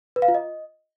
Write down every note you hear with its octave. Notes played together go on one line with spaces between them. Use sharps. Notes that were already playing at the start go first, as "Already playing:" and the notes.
B4
F5
F4
D#5